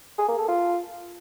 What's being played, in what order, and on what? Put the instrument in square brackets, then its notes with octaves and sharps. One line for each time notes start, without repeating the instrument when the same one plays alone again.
[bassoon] G#4
A#3
A4
F4